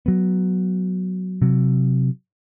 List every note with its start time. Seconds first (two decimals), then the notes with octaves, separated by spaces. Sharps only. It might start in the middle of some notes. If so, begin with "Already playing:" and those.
0.06 F#3 B3
1.42 C3 F#3